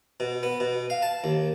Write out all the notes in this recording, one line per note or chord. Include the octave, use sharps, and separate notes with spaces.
B2
B3
B2
F5
A5
D#2